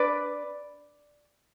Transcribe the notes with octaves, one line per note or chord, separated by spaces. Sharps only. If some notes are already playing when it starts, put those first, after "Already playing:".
Already playing: D4 B4 D5